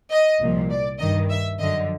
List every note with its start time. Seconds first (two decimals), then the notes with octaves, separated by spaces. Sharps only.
0.11 D#5
0.40 C2 A#2 F3
0.70 D5
1.00 G2 D#3 D#5
1.31 E5
1.60 F#2 D3 F3 D#5